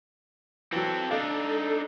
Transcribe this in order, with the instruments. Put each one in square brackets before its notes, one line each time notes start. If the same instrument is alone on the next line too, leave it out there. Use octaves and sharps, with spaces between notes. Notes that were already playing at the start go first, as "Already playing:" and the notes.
[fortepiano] E3 F#3 [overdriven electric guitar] C4 A4
[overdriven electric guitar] D4 D#4 [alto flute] A4 [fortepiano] D#5 F5